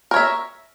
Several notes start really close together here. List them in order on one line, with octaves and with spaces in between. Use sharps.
A#4 C#5 E5